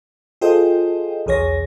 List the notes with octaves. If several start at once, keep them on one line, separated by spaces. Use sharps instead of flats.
F4 G#4 A4 C5 D#5 G5
B1 E2 G#4 C#5 A#6